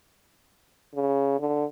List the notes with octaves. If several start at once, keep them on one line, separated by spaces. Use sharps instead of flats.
C#3
D3